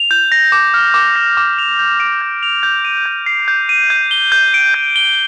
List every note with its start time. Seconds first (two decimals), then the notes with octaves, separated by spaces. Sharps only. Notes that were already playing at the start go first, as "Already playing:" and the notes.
Already playing: F7
0.11 G6
0.32 A#6
0.52 D6
0.74 F6
0.94 D6
1.16 A#6
1.37 D6
1.58 F7
1.79 G6
2.00 D7
2.21 G6
2.43 F7
2.63 G6
2.85 D#7
3.06 G6
3.26 C7
3.48 G6
3.69 D#7
3.90 G6
4.11 G7
4.32 G6
4.54 D7
4.74 G6
4.96 G7